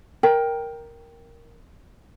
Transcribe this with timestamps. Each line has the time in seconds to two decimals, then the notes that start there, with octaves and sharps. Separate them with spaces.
0.23 A#4 G5